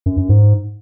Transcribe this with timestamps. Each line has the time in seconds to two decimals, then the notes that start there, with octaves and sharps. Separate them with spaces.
0.06 F#2
0.18 F#2
0.29 G#2